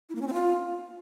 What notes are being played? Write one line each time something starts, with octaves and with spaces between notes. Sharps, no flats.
E4
A#3
C#4
C4
F4